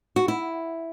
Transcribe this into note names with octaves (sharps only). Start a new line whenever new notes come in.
F#4
E4